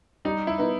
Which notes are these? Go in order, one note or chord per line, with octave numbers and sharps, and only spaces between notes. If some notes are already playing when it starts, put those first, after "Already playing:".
G3 D#4
E4
B3 D#4